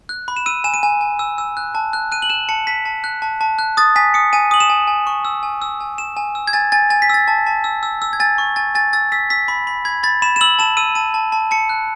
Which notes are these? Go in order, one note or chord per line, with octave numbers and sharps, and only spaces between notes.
F#6
B5
E7
E6 D#7
G#5 E7
D#7
G#5
G#5
E6
E6
F#6
A5
F#6
F#6 D#7
F#7
F#6 E7
A5 C#7
A5 B6
A5
F#6
A5
A5
F#6
D#6 A6
G#5 B6
D#6 C#7
G#5 D#7
D#6 F#7
E7
G#5
G#5
C#6
E6
G#5
E6
G#5
G#5 E7
G#5
E6
G#6
G#5 A6
G#5 A6
G#5 A6
B6
E6 A6
A5
A5
E6
E6
E6
G#6
G#5 A6
C#6
G#5 A6
G#5 A6
E6 A6
E6 B6
E6 B6
B5
B5
B5 G#6
B5 A6
B5 E7
E7
E6 F#7
A5 E7
E6 D#7
A5 D#7
A5
A5
A5 C#7
F#6